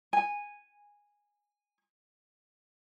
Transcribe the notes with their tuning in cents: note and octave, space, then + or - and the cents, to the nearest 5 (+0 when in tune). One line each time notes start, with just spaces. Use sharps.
G#5 -10